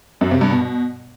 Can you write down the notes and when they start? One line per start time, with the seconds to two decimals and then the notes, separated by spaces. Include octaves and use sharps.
0.21 F#2
0.31 C3
0.41 G2
0.51 B2